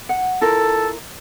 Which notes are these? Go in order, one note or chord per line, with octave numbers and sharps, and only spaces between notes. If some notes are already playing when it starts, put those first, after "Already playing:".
F#5
E4 F4 A4 A#4